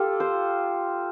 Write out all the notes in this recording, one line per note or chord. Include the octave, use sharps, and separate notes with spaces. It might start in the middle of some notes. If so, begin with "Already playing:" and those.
Already playing: F4 G4 A4
C5